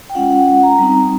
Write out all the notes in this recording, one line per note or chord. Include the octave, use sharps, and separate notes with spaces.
G5
G#3 C#4 F4 F#5
F#5
F#5
A#5
G3 C4 D#4